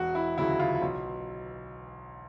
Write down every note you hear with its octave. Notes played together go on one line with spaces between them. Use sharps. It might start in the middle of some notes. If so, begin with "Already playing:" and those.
Already playing: E1 F#4
E4
D2 C#3 F#3 E4
F4
B1